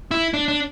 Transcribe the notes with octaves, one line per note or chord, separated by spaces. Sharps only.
E4
D4
D4